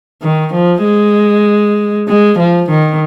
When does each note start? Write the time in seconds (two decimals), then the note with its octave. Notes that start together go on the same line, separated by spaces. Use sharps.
0.22 D#3
0.54 F3
0.84 G#3
2.08 G#3
2.39 F3
2.70 D#3